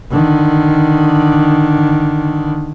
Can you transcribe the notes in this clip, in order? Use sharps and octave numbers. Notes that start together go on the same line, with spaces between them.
D3 D#3